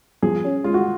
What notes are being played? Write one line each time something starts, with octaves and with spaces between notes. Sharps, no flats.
F3 G#4
C#4
G#3 F4
F#4